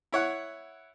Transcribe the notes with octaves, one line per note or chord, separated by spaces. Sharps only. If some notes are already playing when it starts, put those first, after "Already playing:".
E4 C#5 F#5